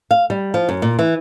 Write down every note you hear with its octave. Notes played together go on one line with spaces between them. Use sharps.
F5
G3
F3
F#2
A#2
E3